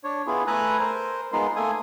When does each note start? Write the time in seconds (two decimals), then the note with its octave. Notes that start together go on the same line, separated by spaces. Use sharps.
0.04 D4 C#5
0.27 B3 E4 F4 G#4
0.47 A3 A4 B4 G#5 A#5 F#6
0.79 A#4 C5
1.33 G#3 B3 D#4 F4 A#4 C6
1.56 A3 A#3 A4 G#5 D#6